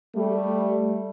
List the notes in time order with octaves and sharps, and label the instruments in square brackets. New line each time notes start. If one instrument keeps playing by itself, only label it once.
[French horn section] G3 A3